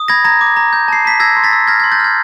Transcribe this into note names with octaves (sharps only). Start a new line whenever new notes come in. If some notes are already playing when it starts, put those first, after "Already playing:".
Already playing: D#6
B5 G#6 A#6
A#5 G#6 A#6
D6
A#5
G6
A5 C7
A5 B6
E6 G#6 A#6
C6
A6 B6
E6
F6 G#6 A#6
G#6
C6
G6 A6
F6 G#6